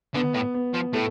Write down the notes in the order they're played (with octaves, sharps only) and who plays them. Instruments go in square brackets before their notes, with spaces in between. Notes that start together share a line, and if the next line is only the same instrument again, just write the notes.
[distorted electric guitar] D3 [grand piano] B3
[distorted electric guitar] A2
[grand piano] B3
[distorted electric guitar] F3
[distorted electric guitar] A2 [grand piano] A3